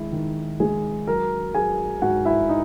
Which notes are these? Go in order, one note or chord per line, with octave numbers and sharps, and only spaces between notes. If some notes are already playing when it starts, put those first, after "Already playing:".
Already playing: D#3 G#3 E4 E5
D#3
G#3 G#4 G#5
F#3 A#4 A#5
F#3 G#4 G#5
G#2 F#4 F#5
E4 E5
D#4